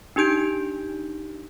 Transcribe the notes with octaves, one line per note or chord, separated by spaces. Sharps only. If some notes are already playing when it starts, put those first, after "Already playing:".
D4 D#4 G4 G6 D7